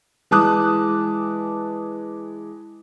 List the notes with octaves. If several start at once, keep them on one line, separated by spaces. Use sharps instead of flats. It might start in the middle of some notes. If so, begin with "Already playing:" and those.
E3 G#3 A5 D6 D#6 F#6